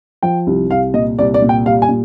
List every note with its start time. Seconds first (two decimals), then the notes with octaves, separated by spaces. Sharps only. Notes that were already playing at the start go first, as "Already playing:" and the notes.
0.23 F3 G5
0.47 C2
0.70 C2 F5
0.94 A#2 D#5
1.19 C2 D5
1.34 D5
1.42 A#2
1.49 G5
1.66 G3 F5
1.82 G#5
1.89 A#2